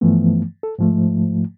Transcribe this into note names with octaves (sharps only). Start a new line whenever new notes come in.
G2 E3 F3 A3 B3
A4
G#2 F3 A3